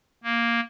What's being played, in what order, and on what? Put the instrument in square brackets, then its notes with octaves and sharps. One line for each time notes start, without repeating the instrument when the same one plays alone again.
[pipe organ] A#3